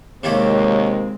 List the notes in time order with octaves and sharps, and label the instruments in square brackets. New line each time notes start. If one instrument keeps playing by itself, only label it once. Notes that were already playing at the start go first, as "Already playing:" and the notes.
[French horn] D#2 [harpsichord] C3 D#3 A#3 [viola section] G#3 C4 [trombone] C#5